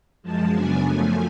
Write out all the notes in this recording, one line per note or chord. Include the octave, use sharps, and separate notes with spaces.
F#2 F3 G#3 A5
F#2 C#3 F#3 B3 D4 G#5
F#2 F3 A3